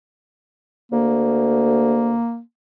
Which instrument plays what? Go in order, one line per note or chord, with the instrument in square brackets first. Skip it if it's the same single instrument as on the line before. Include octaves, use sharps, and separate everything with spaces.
[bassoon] D2 [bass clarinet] A#3